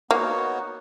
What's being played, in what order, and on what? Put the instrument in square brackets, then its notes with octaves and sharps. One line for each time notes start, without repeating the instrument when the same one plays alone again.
[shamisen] A#3 [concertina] B3 D#4 F#4 C#5